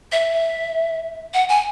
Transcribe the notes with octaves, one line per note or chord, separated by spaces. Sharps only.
E5
F#5
G#5